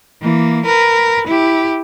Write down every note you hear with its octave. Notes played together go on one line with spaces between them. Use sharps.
E3 A#3
A#4 B4
E4 G4